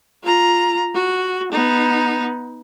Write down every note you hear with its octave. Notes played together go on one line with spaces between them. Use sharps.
F4 A#5
F#4
B3 D#4